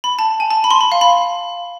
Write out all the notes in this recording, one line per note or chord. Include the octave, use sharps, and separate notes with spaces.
B5
A5
G#5
A5
B5
C6
B5
F5
B5